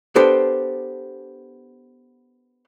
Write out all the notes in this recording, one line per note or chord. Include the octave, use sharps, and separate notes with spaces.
B3 D4 G4 A4 C5